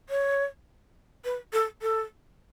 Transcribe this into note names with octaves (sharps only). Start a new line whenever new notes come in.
C#5
B4
A4
A4